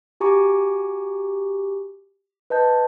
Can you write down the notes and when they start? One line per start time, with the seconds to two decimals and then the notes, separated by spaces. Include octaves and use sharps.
0.20 F#4 G4 G#5 A#5 C#6 D6
2.50 B4 D#5 A5 G6